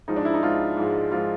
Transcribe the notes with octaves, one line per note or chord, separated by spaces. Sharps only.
G#2 F3 G#3 D#4
D4
E4
D#4
G#2 F3 G#3 F4
G#2 F3 G#3
G#2 F3 G#3 F4